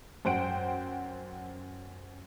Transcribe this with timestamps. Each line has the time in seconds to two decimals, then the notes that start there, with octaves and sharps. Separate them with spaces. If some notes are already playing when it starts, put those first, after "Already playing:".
0.25 F#2 C5 F#5 G5 D7